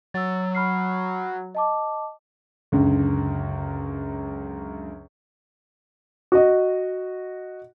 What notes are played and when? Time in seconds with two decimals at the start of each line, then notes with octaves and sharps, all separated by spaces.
0.14 F#3 E6 A6
0.55 B5 F6 C7
1.55 D#5 A5 D6
2.72 C#2 F#2 D3
6.32 F#4 D#5